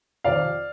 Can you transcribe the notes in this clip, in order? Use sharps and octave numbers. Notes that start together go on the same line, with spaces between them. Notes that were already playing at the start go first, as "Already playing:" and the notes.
F2 C3 D#3 D5 F5